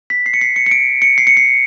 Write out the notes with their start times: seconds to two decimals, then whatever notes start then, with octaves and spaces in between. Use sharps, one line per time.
0.10 B6
0.26 C7
0.34 C#7
0.41 C7
0.56 C#7
0.66 C#7
0.71 D7
1.02 C#7
1.18 C7
1.27 C#7
1.37 C7